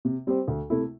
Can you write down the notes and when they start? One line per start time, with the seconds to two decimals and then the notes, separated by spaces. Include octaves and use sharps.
0.05 C3
0.27 G3 C4 G4 C5
0.48 D2
0.70 C3 A3 E4